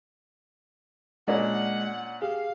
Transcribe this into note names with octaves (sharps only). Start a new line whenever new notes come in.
A#2 G#3 C#4 D4 D#5 F#5
G4 G#4 F5